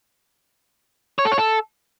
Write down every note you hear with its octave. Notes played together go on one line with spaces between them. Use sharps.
C#5
A4
C#5
A4